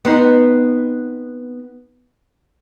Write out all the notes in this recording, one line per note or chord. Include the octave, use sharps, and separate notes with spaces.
B3 C4 D#4